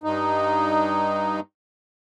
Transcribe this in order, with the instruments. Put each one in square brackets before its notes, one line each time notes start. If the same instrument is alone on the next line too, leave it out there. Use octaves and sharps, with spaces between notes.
[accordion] G2 D#4